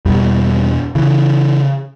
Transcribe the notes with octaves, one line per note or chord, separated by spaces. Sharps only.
E2 B2 G3
C#3 E3